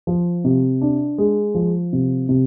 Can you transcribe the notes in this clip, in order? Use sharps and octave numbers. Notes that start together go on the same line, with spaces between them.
F3
C3
D4
G#3
F3
C3
C3